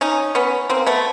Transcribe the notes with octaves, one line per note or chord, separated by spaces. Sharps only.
C#4 D#4
B3 C#4
A#3 C4
A3 B3